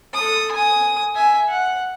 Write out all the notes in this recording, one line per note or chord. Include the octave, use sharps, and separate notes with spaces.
A4 D#6
G#5 D#6
E5 G#5
F#5